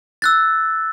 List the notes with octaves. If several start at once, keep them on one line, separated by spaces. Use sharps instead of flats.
E6 F#6 A6